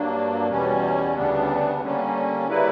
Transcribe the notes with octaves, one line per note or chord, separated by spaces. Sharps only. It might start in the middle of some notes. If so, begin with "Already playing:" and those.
Already playing: G2 F#3 A#3 D4
E2 B2 G3 C#4
D2 C#3 G3 B3 D4
D3 G3 A#3 C#4
C#3 G3 A#3 E4 B4